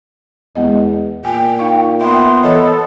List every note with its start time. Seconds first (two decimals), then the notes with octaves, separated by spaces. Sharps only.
0.55 E2 G#3 B3 D#5
1.25 A#2 G5 G#5
1.59 D#4 F5 C#6
2.01 B3 E5 G5 C6
2.43 E3 A4 C#5 D#5